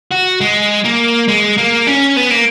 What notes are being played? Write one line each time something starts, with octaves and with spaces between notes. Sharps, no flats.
F#4
G#3
A#3
G#3
A#3
C#4
B3
A#3